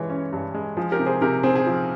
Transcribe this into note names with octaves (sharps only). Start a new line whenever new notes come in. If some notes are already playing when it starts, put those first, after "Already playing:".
Already playing: G2 E3 G#3 C#5 G#5
C#4
G2
G#3
F3 G#4
G4 A#4
C3
G#4 C5
C3 G4 A#4
C4 G#4
G#4
F3